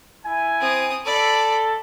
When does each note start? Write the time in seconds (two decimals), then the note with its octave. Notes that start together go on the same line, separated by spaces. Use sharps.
0.25 E4 G#5
0.61 C4 D#6
1.05 A4 D5 B5